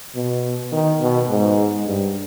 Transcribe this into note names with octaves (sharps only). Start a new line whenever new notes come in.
B2
D#3
B2
G#2
G2